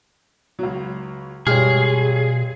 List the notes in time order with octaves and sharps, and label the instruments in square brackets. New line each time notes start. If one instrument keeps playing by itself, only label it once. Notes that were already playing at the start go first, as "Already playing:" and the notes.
[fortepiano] C#2 F#3
[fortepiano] G2 G#3 F6 [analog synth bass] B2 [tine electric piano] G4 C#5 [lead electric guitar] G#4